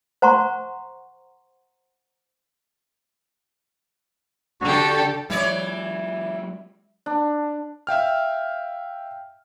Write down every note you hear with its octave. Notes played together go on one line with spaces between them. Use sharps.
C5 F#5 A#5 C6 C#6
D3 F#4 G4 A4
E3 F#3 G#3 C#5 D5
D4
E5 F5 G5 F6